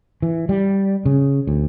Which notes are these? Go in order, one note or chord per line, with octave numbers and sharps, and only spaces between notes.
E3
G3
C#3
D2